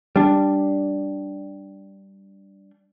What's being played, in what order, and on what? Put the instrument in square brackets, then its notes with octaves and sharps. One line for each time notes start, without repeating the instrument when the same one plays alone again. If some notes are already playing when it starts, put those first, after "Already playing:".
[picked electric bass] G3 D4